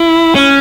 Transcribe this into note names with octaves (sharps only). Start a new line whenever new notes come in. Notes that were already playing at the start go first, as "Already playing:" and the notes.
Already playing: E4
C#4